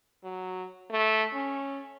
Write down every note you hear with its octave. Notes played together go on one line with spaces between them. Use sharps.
F#3
A3
C#4